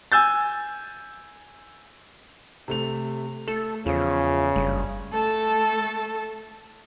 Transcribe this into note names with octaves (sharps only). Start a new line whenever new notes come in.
G#5 E6 G6 A6
C3 A3 F7
A3 A4
E2 C#3 F3
F#1 G2
A3 A4 A5